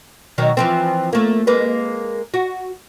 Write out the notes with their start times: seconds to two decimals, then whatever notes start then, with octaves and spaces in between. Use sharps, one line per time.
0.38 B2 D#3 F#3
0.57 E3 F3 C4
1.13 A3 A#3
1.47 G#3 A#3 B4
2.34 F#4